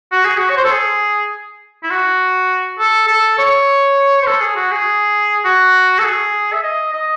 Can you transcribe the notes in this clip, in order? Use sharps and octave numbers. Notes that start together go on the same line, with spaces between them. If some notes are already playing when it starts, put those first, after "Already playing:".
F#4
G#4
F#4
C#5
C5
A4
G#4
E4
F#4
A4
A4
C#5
C5
A4
G#4
F#4
G#4
F#4
A4
G#4
E5
D#5
D#5